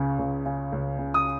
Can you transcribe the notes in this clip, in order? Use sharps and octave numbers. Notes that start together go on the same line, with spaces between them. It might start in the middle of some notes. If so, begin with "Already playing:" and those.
Already playing: C#2 C#3
C#2
C#3
C#2
C#3
D#6